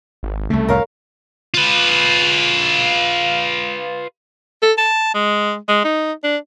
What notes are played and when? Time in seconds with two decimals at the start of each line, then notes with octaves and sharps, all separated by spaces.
0.23 G#1
0.50 C2 C#3 A3
0.68 C2 F2 A2 A#4 C#5 F5
1.54 F4 B4
4.62 A4
4.78 A5
5.14 G#3
5.68 G#3
5.84 D#4
6.24 D4